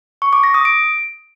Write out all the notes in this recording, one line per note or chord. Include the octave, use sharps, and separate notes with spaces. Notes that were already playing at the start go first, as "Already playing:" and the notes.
C#6
D6
A#6
D#6
D7